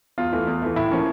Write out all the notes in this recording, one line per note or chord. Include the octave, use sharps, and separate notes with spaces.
E2 F4
E3 A3
E2
E3 A3
A2 E4
F3 A#3 C#4